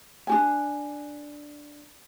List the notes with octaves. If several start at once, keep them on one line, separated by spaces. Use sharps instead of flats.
D4 F#4 G#5